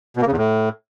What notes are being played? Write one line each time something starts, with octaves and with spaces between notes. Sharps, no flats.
B2
A#3
C#3
E2
A2